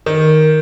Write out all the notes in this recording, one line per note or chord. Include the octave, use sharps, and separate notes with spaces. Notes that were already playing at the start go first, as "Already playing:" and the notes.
D#3